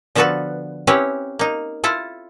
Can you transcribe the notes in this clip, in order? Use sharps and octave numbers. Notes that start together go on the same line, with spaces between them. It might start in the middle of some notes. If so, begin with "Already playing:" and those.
D3 F3 B3 F#4 A4 B4
C4 C#4 E4 G4 B4 C#5
A#3 D#4
E4 F4 A4